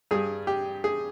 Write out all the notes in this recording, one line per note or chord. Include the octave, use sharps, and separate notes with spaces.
G2 G3 G#4
G4
G#4